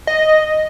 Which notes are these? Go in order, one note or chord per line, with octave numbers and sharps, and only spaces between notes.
D#5